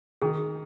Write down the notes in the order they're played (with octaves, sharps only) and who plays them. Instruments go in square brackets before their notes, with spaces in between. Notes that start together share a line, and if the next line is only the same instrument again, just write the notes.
[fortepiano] D#3 [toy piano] G#4